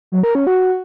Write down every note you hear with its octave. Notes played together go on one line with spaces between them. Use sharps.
F#3
A#4
C#4
F#4